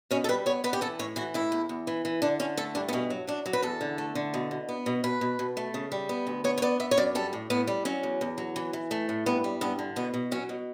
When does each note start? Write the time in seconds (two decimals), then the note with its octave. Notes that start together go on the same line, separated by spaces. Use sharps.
0.11 B2 C#4
0.24 A4
0.29 G3 B4
0.46 B3 C#5
0.64 B3 B4
0.73 G4
0.81 E3 A4
0.99 A2 C#5
1.16 E3 F#4
1.34 A2 E4
1.52 E2
1.69 E2
1.87 E3
2.05 E3
2.22 D3 D4
2.39 D3 C#4
2.57 A3 A4
2.75 G2 D4
2.88 B3
2.93 B2 C#4
3.10 F#3
3.27 F#3 D4
3.46 F#3
3.53 B4
3.62 E2 A4
3.81 D3
3.98 A3
4.15 D3
4.34 B2
4.51 B2
4.69 B3
4.86 B2
5.04 B2 B4
5.21 B2
5.39 B2
5.57 A3
5.74 C#3
5.92 G3
6.09 B3
6.27 D2
6.44 B3 C#5
6.58 C#5
6.62 B3 D5
6.80 B3 E5
6.91 C#5
6.97 F#2 D5
7.15 G3 A4
7.33 A2
7.50 A2 B3
7.67 G3
7.85 F#3 C#4
8.03 E2
8.21 E2
8.38 F#3
8.56 E3
8.73 E3
8.91 A3
9.09 A2
9.26 G2 B3
9.44 G3
9.61 G2 B3
9.79 D3
9.96 B2 B3
10.14 B2
10.31 F#3 C#4
10.49 B2